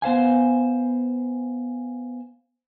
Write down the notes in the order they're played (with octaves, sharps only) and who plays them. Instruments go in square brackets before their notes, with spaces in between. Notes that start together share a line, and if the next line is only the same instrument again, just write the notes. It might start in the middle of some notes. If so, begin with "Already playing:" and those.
[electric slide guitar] B3 C5 F5 G#5